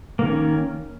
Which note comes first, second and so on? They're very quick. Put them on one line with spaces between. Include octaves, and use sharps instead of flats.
A#3 D#3 C#4